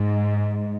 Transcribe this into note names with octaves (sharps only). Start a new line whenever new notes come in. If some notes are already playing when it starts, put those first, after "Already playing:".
Already playing: G#2